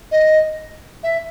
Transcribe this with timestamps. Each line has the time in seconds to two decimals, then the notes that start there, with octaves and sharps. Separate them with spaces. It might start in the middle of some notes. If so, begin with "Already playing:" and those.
0.11 D#5
1.03 E5